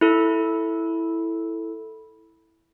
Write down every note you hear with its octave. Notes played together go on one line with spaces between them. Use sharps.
E4 A4